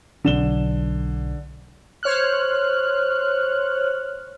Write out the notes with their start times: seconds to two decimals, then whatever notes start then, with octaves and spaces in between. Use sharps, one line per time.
0.24 B1 D3 F#3 E7 G7
2.03 C5 C#5 F6 F#6